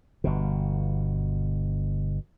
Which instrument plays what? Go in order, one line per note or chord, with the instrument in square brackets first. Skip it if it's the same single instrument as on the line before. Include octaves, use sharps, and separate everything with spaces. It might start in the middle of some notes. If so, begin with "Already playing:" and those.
[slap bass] G1 B2